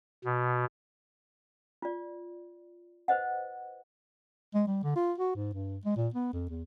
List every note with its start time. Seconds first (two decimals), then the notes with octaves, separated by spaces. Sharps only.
0.25 B2
1.82 F4 D5
3.08 B4 C5 D#5 F#5
4.54 G#3
4.67 G3
4.83 D3
4.96 F4
5.18 F#4
5.35 G#2
5.53 G2
5.85 G#3
5.97 A#2
6.14 B3
6.33 F2
6.49 E2